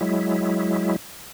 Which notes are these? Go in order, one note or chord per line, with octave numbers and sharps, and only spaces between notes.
F#3 G#3 E4